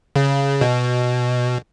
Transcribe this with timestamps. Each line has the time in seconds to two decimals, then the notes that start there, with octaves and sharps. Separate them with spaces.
0.16 C#3
0.61 B2